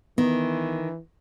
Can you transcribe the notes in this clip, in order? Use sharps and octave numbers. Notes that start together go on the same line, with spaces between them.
D#3 E3 B3